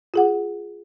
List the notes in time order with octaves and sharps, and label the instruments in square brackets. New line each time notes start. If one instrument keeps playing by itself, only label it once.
[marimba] F4 G#4 F#5